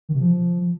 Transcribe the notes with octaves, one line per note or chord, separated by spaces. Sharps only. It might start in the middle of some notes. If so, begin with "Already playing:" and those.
D#3
C3
F3